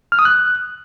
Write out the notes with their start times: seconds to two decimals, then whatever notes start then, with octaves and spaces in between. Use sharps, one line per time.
0.12 F6
0.19 D#6
0.25 F#6